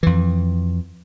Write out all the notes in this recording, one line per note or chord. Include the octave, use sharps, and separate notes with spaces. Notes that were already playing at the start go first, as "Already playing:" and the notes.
F2 E3